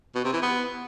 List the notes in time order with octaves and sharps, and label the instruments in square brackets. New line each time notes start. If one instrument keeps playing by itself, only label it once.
[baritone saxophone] B2
C3
E3
B3